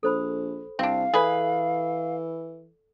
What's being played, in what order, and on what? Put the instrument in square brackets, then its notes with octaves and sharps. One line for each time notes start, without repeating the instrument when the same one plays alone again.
[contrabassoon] A#1 [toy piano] A4 C5 B5
[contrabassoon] C2 [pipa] C4 D4 [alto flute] F5
[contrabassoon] E3 [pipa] G#4 B4 [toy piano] A4 D5